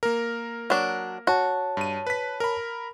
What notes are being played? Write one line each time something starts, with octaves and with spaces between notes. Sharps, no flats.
A#3 A#4
F#3 D4
F#4 C#5 A5
G2 D#7
B4 B6
A#4 B5